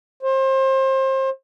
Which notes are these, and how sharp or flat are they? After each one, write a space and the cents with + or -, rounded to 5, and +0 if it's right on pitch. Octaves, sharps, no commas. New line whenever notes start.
C5 +30